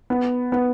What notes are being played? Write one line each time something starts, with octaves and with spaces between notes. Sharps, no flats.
B3
B3